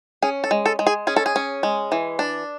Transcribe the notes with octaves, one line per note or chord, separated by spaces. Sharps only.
C#4 G#4
A4
G#3
A4
G#3
G#4
C#4 G#4
A4
G#4
C#4
G#3
E3
D4